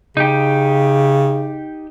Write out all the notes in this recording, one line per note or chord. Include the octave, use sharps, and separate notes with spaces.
C#3 D#4 G4